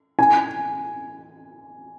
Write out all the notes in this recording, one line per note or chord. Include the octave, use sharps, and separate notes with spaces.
G#5